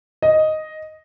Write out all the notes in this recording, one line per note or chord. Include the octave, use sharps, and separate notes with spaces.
D#5